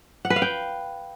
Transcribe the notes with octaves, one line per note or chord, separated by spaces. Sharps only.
F#5
B4
F5
G5